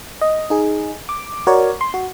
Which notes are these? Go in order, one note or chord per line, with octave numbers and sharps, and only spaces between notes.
D#5
D#4 G#4
D6
F#4 A#4 C#5 D5
C6
F#4